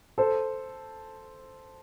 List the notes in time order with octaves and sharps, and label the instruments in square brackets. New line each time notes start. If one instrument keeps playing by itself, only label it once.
[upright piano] A4 C5